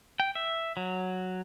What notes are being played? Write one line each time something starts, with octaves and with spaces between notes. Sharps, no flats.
G5
E5
F#3